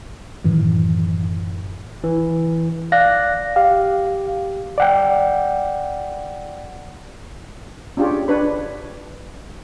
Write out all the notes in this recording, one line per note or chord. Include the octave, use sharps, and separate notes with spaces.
F#2 A2 D#3 E3
E3
D5 F5 F#6 A#6
G4 F5
D5 F#5 G5
C#4 D4 F4 G4 G#4 C#5
D4 B4 C#5 B5